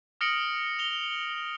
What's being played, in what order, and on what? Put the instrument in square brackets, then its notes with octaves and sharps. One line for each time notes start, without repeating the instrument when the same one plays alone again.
[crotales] D#6 F6 A#6 C#7 D7 F#7
F7 G7